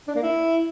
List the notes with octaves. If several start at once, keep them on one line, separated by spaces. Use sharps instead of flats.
D4
A#3
E4